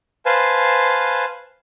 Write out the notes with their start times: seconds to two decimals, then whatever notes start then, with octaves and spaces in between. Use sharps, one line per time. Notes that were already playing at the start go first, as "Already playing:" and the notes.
0.26 B4 C5 F5 G#5 A5